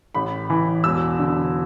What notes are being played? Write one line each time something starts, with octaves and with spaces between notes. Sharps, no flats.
A1 B5
E3
E1 E6
D3